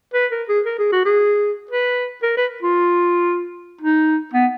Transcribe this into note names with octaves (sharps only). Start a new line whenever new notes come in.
B4
A#4
G#4
A#4
G#4
F#4
G#4
B4
A#4
B4
F4
D#4
B3